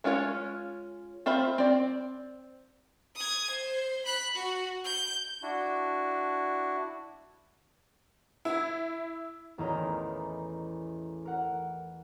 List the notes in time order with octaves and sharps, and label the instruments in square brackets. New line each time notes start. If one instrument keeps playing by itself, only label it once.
[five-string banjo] G#3 C#4 F4 A4 C#5
C4 F4 C5 E5 B5
C4 D5
[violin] D#6 G#6
C5
B5 F#6
F#4
G6
[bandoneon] D4 E4 F#4
[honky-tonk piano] E4
[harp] A1 E2 E4 A#4 D#5 A#5
A#4 F#5